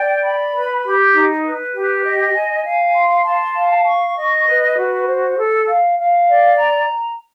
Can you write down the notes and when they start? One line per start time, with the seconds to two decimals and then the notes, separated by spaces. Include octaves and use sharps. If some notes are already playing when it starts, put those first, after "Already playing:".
Already playing: D5 G5
0.23 B5
0.53 B4
0.84 G4
1.14 D#4
1.44 B4
1.74 G4
2.04 D#5
2.34 G#5
2.64 F5
2.94 C6
3.25 A5
3.55 F5
3.85 C#6
4.16 D#5
4.47 B4
4.77 F#4
5.07 C5
5.38 A4
5.67 F5
5.98 F5
6.28 D5
6.58 A#5